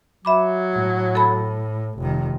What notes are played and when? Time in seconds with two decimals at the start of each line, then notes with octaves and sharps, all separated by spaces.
0.25 F#3 E5 B5 D6
0.73 A2
1.15 A4 A5 B5
1.99 F1 D#3